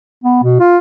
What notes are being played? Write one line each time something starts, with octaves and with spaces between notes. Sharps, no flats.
B3
B2
F4